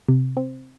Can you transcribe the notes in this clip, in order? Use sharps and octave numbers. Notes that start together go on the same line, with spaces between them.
C3
C4